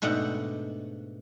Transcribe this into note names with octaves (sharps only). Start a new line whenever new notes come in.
G#2 B2 A3 D4 F#5 G5